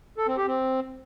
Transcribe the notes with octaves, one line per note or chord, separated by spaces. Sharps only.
A4
C4
G4
C4